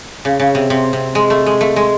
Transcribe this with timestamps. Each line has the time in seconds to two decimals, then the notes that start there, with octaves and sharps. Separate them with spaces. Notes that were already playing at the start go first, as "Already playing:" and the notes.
0.25 C#3
0.40 C#3
0.55 C3
0.70 C3
0.93 C3
1.15 G#3
1.30 A3
1.46 G#3
1.61 A3
1.76 G#3